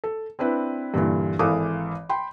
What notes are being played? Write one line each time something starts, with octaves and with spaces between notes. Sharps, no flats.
A4
C4 D4 E4 B4
G2 A#2 D3 E3
G#1 E3 A4 F5 D6 D#6
G5 B5 C6